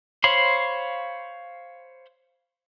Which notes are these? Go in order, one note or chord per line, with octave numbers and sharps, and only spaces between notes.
C5 C#5 F5 B5 C6